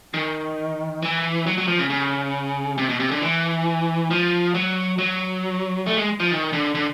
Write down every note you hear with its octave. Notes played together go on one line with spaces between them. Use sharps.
D#3
E3
F#3
F#3
F3
C#3
C#3
C3
B2
C3
D3
E3
F3
F#3
F#3
A3
G#3
F3
D#3
D3
D3